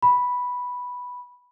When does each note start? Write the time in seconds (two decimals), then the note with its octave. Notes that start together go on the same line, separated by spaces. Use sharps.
0.02 B5